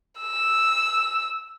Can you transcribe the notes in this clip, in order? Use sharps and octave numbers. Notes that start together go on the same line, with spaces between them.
E6